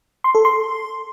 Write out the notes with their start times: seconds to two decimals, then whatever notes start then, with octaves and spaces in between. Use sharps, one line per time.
0.24 C6
0.35 A4
0.45 C6